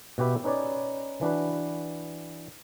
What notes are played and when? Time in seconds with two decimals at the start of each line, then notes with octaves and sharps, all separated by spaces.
0.18 B2 F#4 G4 B4 E5
0.44 C#4 D#4 B4 C#5 D5
1.21 E3 D4 F#4 B4